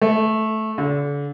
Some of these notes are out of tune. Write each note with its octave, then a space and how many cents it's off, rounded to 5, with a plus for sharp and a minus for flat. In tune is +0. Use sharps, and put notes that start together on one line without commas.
A3 -10
D3 -40